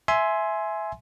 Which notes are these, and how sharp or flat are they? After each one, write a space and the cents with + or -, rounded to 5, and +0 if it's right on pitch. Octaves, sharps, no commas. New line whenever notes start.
E5 +0 G#5 +15 C6 +0